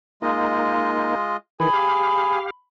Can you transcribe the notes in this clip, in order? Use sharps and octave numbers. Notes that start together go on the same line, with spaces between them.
G#3 A#3 D#4 F4 D#5
D#3 E3 G#4 G#5 B5
G4 F5